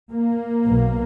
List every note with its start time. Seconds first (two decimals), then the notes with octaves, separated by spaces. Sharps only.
0.11 A#3
0.65 B1 B2